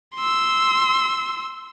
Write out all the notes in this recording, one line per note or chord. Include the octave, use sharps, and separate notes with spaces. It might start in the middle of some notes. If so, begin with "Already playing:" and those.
C6 E6